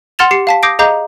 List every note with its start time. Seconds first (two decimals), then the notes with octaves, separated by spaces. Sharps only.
0.19 F#5 C6 F6 A6 E7 F7
0.31 G4 C7 C#7
0.47 F5 A5 B6
0.63 D6 D#6 G6 A#6 C7 D7
0.79 G#4 D#5 F5 A#5 D6 G6